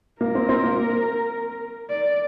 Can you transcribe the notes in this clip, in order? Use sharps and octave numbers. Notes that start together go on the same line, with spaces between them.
A#3 A#4
C4
C4
A#3
D5